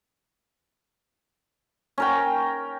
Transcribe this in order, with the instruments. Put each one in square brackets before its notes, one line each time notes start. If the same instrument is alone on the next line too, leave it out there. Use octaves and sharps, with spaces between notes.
[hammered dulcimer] C#4 A#4 G5